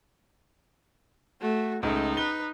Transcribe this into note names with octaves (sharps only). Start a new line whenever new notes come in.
A3 F#4
C#2 A3 D#4
B4 G7